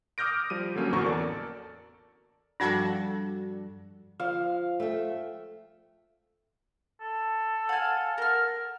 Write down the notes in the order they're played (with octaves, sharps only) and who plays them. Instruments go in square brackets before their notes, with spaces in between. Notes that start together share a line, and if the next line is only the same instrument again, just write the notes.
[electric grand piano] D6 D#6 F6 G6 A#6 D7
F3 G3 D#7
D3 F#3 A#3 C#4
A1 E2 F#4 A#4 C#6
A4 A#4 D5
[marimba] G2 F3 G3 [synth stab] D4 F#4 A4
[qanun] F3 [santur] F5
[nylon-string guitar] A3 G5 [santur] E5
[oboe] A4
[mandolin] F5 G#5 [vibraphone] F#5
[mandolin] A#4 F6